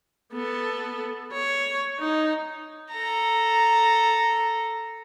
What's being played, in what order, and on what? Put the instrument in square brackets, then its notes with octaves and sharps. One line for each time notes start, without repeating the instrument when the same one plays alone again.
[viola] B3 A4
C#5
D#4
[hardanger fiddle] A4 A#5